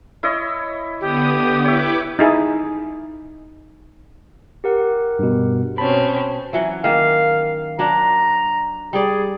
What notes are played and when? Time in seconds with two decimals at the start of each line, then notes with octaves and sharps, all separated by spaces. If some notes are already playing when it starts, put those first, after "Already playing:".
0.23 E4 C#5 D#5
1.01 D3 B3 G4 D#6
1.65 E4 B4 C#5 E5 D6
2.19 D#4 E4 G#4
4.64 G4 A#4 F#5
5.19 G2 B2
5.78 B2 C4 C#4 A5 B5
6.53 E3 F#3 C#4
6.84 D#3 A#3 F5
7.79 F#3 D4 A#5
8.93 G3 G#4 D5